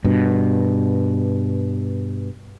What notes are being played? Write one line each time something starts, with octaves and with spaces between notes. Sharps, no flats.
G2 B2